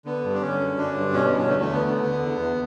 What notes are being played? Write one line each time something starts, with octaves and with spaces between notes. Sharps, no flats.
D3 B3
G2
D4
D3 C#4
F#2
D3 D4
G2
B2 C#4
B3
E2
C#4
D3 A3
A3
D2 B3
D3
D3
E2
E2